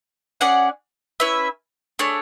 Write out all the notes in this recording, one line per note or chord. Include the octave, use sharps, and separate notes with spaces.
C#4 G#4 D5 F#5
C#4 E4 B4 E5
A3 D4 G#4 C#5